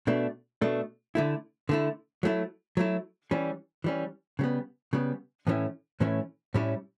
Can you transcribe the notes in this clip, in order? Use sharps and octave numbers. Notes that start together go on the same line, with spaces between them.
B2 A3 D4
B2 A3 D4
D3 A3 E4
D3 A3 E4
F#3 A3 E4
F#3 A3 E4
E3 G3 C#4
E3 G3 C#4
C#3 G3 B3
C#3 G3 B3
A2 E3 A3 C#4 E4
A2 E3 A3 C#4 E4
A2 G3 C#4 E4